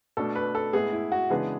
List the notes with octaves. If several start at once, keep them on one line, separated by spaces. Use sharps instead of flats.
B2 A3 D4 A4
B4
A4
A2 G#3 B3 G#4
E4
F#4
C#3 E3 G#3 B3 D4 G#4